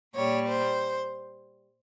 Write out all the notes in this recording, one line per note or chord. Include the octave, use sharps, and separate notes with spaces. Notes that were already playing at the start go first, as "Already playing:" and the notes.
A#2 G3 C#5
C5